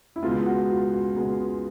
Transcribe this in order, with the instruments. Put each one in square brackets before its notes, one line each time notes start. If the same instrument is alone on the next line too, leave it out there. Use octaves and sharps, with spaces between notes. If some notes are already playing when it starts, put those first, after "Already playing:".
[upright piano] E4
[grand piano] C#2 B2 G#3 B3 [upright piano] F4
[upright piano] F#4
F4
F#4
[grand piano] C#2 B2 G#3 B3